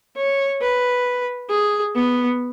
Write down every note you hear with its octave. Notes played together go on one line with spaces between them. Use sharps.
C#5
B4
G#4
B3